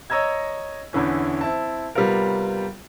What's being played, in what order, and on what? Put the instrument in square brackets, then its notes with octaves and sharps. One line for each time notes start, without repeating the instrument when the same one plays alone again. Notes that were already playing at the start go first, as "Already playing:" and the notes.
[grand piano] C#5 D#5 A#5 E6 G#6
E2 D3 E3 C#4
C4 E4 A5
C3 G3 B3 F4 A#4